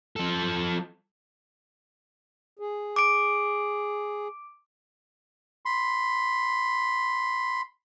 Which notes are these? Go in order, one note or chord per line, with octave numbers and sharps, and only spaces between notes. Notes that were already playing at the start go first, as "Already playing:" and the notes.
F3 A4
G#4
D6 D7
B5 C6